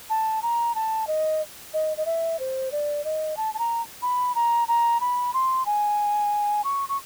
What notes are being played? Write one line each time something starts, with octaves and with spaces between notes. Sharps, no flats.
A5
A#5
A5
D#5
D#5
D#5
E5
C5
D5
D#5
A5
A5
A#5
B5
A#5
A#5
B5
C6
G#5
C#6
C#6